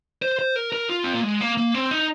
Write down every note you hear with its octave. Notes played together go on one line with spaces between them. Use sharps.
C5
C5
A#4
A#4
F4
C4
A#3
G#3
A#3
A#3
C4
D#4